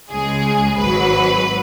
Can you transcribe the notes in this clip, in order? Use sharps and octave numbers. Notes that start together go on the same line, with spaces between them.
C#2 C#3 G#3 G#4
G#1 G#2 F#3 B4